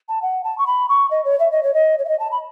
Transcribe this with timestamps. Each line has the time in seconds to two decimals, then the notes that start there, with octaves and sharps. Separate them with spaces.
0.09 A5
0.22 F#5
0.44 A5
0.58 C#6
0.67 B5
0.89 C#6
1.11 D#5
1.25 C#5
1.40 E5
1.51 D#5
1.63 C#5
1.74 D#5
1.99 C#5
2.05 E5
2.09 D#5
2.20 A5
2.31 B5